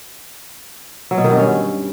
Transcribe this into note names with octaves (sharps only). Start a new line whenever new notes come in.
F#3
B2
D#3
G2
C#4